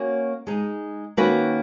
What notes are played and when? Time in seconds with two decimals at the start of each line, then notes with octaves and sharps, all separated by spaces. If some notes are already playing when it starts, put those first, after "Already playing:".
Already playing: A#3 C#4 F#4 C#5
0.47 G#3 D#4 G#4
1.17 D#3 A#3 C#4 F#4 B4